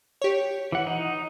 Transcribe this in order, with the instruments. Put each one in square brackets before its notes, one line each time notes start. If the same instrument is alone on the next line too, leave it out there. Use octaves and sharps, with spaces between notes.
[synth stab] G4 C#5
[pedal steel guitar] E3 F#5
D#4